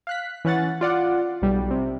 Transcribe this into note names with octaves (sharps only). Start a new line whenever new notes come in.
F5 F#6 B6
E3 C#4 F#5 A6
F4 D5 F#5
B1 G3
C3